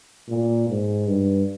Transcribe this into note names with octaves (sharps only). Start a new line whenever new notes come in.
A#2
G#2
G2